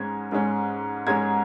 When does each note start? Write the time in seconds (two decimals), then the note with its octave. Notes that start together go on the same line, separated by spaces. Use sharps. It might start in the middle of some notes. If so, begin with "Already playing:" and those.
Already playing: G#2 G#3 C#4 G#6
0.32 G#2 G#3 C#4
1.07 G#2 G#3 C#4 G#6